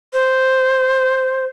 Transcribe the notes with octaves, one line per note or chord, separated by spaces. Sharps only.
C5